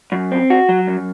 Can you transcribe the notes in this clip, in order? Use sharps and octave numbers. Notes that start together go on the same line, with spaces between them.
F#2
C4
F#4
F#3
F#2